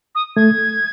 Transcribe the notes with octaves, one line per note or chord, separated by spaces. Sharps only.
D#6
A3 G#6